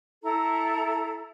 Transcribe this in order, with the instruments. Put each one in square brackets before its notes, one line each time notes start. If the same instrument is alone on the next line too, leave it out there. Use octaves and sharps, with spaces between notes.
[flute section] E4 A4 A#5